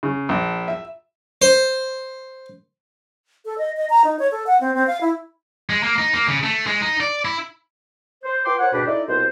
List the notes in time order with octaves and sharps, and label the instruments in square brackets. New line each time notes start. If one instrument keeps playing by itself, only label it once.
[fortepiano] C#3
A#1
E5
[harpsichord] C5
[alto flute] A4
D#5
D#5
A#5
D#4
C#5
A4
F#5
C4
C4
F5
E4
[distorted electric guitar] G#3
A#3
D#4
A#3
C#3
A3
G#3
D#4
D5
E4
[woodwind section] C5
F4 B4 G5 C6 D6
A#4 C5 C#5 F#5
D2 G#2 B2 D4 G4 B4
D#4 E4 A4 D5
C2 B2 B4 C5